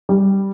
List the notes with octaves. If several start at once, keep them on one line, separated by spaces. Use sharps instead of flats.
G3